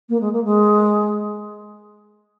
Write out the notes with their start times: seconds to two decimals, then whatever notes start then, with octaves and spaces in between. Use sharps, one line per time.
0.09 A#3
0.21 G#3
0.33 A#3
0.44 G#3